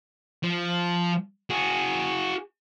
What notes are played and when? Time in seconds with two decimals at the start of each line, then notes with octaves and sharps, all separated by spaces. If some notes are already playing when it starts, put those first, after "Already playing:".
0.44 F3
1.50 F#4 G#4